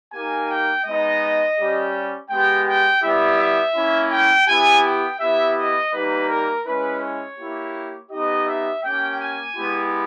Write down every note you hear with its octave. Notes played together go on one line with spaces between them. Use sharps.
A#3 D#4 G4 G#5
G5
G#3 B3 D#4 D#5
G3 C#4 G4
G#3 B3 G4 G5
G5
G3 B3 E4 G4 E5
E5
A#3 C#4 E4
G5
B3 E4 G4 G#5
G5
B3 E4 G4 E5
D#5
G3 A#3 D#4 G4 B4
A#4
G#3 C#4 E4 B4
C#5
A#3 E4 G4
B3 D#4 G4 D#5
E5
A#3 C#4 G4 G5
G#5
G#3 B3 E4 G4